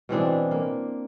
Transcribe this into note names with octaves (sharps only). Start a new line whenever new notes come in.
B2 E3 C4 D4
A#3